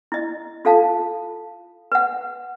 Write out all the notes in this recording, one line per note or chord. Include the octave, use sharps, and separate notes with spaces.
E4 D#5
F4 A4 F5 A5
B4 F#5